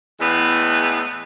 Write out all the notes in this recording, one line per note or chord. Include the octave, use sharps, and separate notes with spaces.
E2 A2 G#3 B3